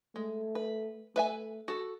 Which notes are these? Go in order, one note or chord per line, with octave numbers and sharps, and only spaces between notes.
G#3 A3
B4
A3 B4 E5 G#5
F#4 A4